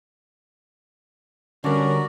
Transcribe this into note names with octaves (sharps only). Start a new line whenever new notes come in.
D3 G3 C#4 F#4 A#4 D5